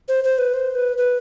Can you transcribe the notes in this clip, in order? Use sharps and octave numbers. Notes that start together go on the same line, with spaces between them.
C5
C5
B4
C5
B4
B4